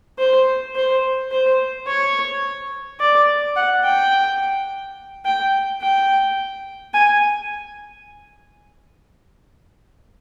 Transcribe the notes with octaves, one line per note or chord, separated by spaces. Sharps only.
C5
C5
C5
C#5
D5
F#5
G5
G5
G5
G#5